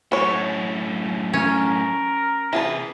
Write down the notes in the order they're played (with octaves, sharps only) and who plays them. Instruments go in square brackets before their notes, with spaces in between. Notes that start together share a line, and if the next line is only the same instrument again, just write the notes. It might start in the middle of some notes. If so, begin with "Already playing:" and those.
[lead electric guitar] F#2 A2 [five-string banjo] A4 C#5
[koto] C#4 [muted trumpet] A#4
[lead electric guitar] C3 B4 [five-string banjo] E3 G#4 A5